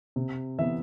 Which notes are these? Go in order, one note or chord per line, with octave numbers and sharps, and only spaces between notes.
C3
E3 B3 E5